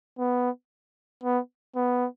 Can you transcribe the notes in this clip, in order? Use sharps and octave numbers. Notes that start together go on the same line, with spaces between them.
B3
B3
B3